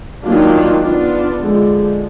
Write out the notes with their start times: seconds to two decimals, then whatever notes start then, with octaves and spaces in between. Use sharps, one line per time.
0.24 D#3 F#3 A#3 D4 F4
0.82 B3 D4 F4
1.39 D3 F3 G#3